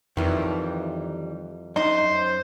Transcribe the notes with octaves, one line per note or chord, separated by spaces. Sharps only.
F2 D#3 E3 G3
F#2 D#4 C5 C6